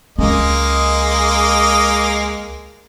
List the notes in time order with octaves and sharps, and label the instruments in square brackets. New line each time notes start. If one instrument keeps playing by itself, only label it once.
[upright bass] C#2 C#4 [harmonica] G#3 A#3 D#5